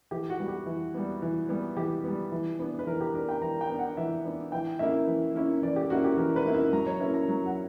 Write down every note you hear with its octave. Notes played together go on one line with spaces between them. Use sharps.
E3 G4
F#4
G3 B3
G4
E3
G3 B3
E3
G3 B3
E3 G4
G3 B3
E3
B3 D4
B4
E3 A#4
G4
B3 D4 A#4
G5
E3 A#5
G5
B3 D4
F#5
E3 E5
B3 D4
E3 G5
A#3 C#4 E4 E5
E3
A#3 C#4 E4
E3 D5
G4
A#3 C#4 E4 F#4
G4
E3 A#4
B4
A#3 C#4 E4
E5
F#3 A#5
C#5
A#3 C#4 E4 B4
A#5
F#3
F#5